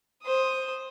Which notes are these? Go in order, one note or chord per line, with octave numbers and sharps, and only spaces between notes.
C5 D#6